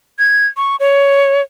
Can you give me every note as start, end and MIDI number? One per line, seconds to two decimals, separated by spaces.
0.19 0.46 92
0.57 0.76 85
0.80 1.42 73